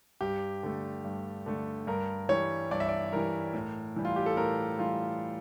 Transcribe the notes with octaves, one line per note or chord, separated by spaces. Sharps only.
G2 G4
D3 A3
G2
D3 A3
G2 A#4
E3 G3 C#5
G2 D5
E5
D5
E3 G3 A#4
A2
E3 G3
F4
G4
A4
A2 A#4
E3 G3 F4